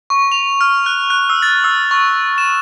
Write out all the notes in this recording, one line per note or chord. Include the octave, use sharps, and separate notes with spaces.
C#6
F7
F6
F#6
F#6
E6
A6
E6
C#6
E7